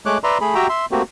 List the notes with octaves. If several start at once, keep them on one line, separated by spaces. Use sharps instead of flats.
G#3 A3 C#5 D6 F#6
B4 D5 E5 A#5 C6
A3 G#4 B5
F#4 G4 E5 G5 A#5
E5 C6
A3 A#3 C4 F#4 G4